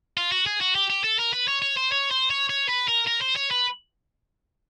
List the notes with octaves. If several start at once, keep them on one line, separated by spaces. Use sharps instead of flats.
F4
F#4
G#4
F#4
G4
G4
A4
A#4
B4
C#5
C#5
C5
C#5
C5
C#5
C#5
B4
A#4
A#4
C5
C#5
B4